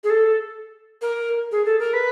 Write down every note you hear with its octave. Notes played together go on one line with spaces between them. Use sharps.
G#4
A4
A#4
G#4
A4
A#4
B4